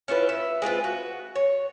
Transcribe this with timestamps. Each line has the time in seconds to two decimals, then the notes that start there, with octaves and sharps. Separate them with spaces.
0.08 C#4 E4 F4 B4
0.29 E5
0.62 G#3 C4 F4 B4
0.84 F#4
1.36 C#5